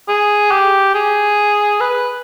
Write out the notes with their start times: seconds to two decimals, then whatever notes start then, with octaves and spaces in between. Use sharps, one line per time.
0.08 G#4
0.51 G4
0.94 G#4
1.81 B4